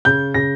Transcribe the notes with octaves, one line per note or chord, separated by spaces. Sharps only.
C#3 G6
C#3 A#6